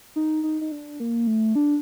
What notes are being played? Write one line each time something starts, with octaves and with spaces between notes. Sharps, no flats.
D#4
D#4
D#4
D4
A#3
A3
D4